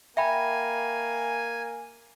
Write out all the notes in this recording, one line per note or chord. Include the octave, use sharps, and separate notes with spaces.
A#3 E5 G5 G#5 B5